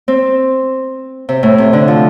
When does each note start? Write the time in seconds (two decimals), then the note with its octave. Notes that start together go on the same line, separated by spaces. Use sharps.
0.08 C4
1.29 C3
1.43 A2
1.58 C3
1.73 D3
1.88 F3